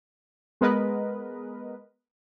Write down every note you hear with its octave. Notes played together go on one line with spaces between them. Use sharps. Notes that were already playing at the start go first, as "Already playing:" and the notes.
G#3 B3 A#4 B4 D#5